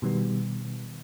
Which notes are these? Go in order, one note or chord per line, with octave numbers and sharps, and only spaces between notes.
B2 D#3 G3 B3